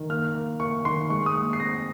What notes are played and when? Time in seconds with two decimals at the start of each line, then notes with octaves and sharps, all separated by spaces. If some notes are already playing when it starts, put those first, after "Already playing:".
Already playing: D#3
0.10 A#3 F6
0.34 A#3
0.60 A#3 C#6
0.85 D#3 C6
1.10 G#3 C#6
1.26 D#6
1.36 A#2
1.53 C7
1.60 C4 A#6